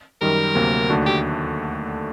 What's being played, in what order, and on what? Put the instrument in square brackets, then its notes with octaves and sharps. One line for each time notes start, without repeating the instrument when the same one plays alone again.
[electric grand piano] F#2 D#3 G3 [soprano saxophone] A#4
[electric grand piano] D2 C3 F#3 A#3
D#2 D3 A3 D4 F#4
[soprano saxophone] G4